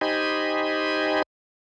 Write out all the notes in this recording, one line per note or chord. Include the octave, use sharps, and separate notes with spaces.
D#4 G4 C5 D#5 G#5 B5